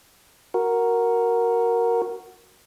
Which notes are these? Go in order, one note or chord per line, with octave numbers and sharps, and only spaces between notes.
F#4 A#4